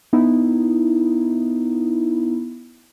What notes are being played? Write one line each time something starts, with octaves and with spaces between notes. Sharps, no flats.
B3 D#4 E4